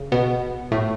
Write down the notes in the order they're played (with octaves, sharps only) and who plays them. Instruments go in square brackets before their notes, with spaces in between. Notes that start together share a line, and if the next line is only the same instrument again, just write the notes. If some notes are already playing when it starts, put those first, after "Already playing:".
Already playing: [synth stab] C#3
B2 B3
A2 A3